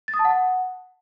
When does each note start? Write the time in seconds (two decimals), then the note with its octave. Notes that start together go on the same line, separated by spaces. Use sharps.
0.08 A6
0.14 D#6
0.19 A5
0.25 F#5